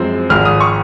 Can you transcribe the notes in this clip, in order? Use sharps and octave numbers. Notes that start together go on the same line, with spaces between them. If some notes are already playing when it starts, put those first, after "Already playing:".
Already playing: F#2 F3 G#3 C4
G#1 G#2 F3 G#3 F6
D#6
C#6